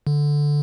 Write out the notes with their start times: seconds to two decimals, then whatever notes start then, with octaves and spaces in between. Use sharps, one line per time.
0.07 D3